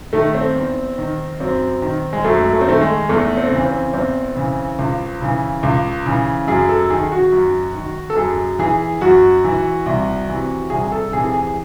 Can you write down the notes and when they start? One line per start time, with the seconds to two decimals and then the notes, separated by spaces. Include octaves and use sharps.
0.13 D#3 A3
0.35 C4
0.56 E2
0.98 D#3
1.40 F#2 C4
1.82 D#3
2.13 G#3
2.24 F#2 A3
2.53 A3
2.61 C4
2.67 D#3 A3
2.81 G#3
3.09 E2 A3
3.37 C4
3.51 C#3 E3
3.65 C4
3.94 E2 C4
4.36 C#3 E3
4.79 C#2
5.21 C#3 E3
5.63 C#2
6.06 C#3 E3
6.48 F#2 G#4
6.69 A4
6.90 D#3 G#4
7.12 F#4
7.32 F#2
7.75 D#3
8.10 A4
8.16 F#2 G#4
8.59 E3 G#4
9.01 F#2 F#4
9.44 E3
9.86 C2
10.28 C3 E3
10.70 C2 G#4
10.84 G#4
10.92 A4
11.12 C3 E3 G#4
11.34 G#4